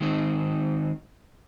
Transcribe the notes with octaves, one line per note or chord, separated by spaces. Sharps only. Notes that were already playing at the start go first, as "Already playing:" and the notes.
D#3 G#3 C4 D#4